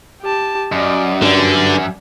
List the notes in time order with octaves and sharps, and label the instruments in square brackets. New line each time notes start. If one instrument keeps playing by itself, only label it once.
[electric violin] G4 A5
[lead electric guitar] F#2 [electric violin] D5 D#5
[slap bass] G2 [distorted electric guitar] D3 [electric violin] D5